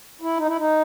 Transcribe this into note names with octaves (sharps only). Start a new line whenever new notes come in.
E4
D#4
E4
D#4